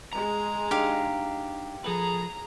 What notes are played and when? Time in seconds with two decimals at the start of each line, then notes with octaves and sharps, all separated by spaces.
0.13 G#3 A#5
0.71 D4 D#4 G4 F5
1.84 F3 G#4 A4 B4 A#5